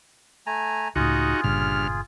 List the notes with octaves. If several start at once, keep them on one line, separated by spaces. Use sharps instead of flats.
A3 G#5 A#5
C#2 A2 D#4 F4 F#4 G#4
G1 G2 A#2 C#3 F6